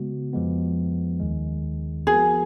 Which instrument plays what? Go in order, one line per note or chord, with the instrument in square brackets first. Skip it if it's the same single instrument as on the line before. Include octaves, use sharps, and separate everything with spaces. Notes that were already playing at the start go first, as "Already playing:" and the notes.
Already playing: [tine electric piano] C#3 G#3 B3 F#4
F2 F3 G#3 B3
D#2 D#3 G#3
[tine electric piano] F3 B3 F#4 A#4 [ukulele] G#4